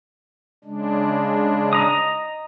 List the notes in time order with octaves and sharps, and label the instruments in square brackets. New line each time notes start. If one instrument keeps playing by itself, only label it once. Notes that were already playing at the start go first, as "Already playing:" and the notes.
[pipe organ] C#3 G#3 D4
[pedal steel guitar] D#5 A#5 D#6